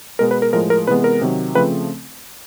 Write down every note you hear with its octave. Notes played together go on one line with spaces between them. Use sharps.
B2 G#3 B3 A#4
B4
A#4
A2 F3 G#3 A#4
A#4
C3 E3 G#3 B3 B4
A#4
C3 D#3 F#3
C#3 F3 A3 C4 B4